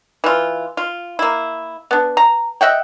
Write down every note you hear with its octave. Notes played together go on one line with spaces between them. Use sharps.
E3 F4
F4
A#3 E4
B3 D4
A#5
D#5 E5 F#5 G5